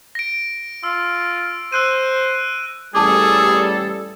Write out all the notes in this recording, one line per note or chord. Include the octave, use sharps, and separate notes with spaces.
A#6 D7
F4 E6
C5 E6 F#6 D#7
A1 G3 G#4 A4 A5 D6